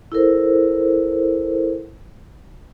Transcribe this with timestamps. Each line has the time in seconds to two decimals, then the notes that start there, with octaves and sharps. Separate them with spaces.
0.12 E4 A4 A#4 C5